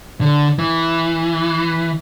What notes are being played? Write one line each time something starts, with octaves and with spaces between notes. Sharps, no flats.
D3
E3